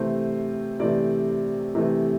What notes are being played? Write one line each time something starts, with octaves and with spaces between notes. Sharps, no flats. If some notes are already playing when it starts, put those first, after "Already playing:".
Already playing: C3 E3 A3 C5
C3 E3 A3 D5
C3 E3 A3